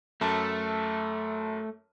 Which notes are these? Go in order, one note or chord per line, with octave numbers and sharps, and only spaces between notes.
F#2 A3 A5